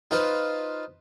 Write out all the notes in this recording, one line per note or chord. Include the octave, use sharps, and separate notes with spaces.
D#4 F4 B4 C5